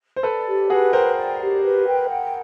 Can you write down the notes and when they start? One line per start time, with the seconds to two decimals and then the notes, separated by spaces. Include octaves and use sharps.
0.16 C5
0.23 A4 B4 D5
0.47 G4
0.70 F#4 G#4 B4
0.93 A#4 C5 G5
1.16 D5
1.40 G4
1.63 B4
1.86 G5
2.09 F#5